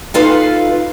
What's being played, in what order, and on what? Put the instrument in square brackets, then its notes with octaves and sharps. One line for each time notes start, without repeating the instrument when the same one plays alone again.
[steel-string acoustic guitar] D#4 F4 A4 B4 F5